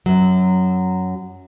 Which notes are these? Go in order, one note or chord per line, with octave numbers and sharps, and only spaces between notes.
F#2 F#3